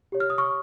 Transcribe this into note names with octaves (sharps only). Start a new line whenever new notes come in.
G4 C#5
F6
D#6
C#6 F6